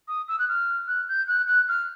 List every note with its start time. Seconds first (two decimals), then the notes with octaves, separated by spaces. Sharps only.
0.08 D#6
0.28 E6
0.39 F#6
0.48 F6
0.87 F#6
1.08 G6
1.28 F#6
1.47 F#6
1.68 F6